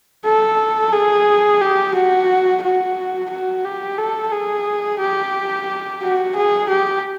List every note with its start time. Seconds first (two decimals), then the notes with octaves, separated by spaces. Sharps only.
0.25 A4
0.92 G#4
1.61 G4
1.95 F#4
2.62 F#4
3.30 F#4
3.65 G4
3.98 A4
4.32 G#4
5.00 G4
6.02 F#4
6.36 G#4
6.69 G4